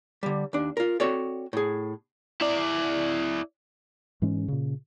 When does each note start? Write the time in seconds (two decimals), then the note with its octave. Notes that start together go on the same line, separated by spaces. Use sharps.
0.23 D3 G3
0.53 D#2 D4
0.77 F4 A#4
1.00 C4 F#4 A4 C#5 D5
1.53 A2 G#4
2.41 E4 D5
4.22 G#2 E3 G#3 C#4
4.48 A#2 C#3